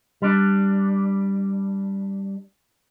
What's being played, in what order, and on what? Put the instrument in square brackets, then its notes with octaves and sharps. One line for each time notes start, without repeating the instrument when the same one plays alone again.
[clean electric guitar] G3 D4